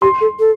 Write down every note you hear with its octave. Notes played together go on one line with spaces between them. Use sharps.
G4 C6
A4
A4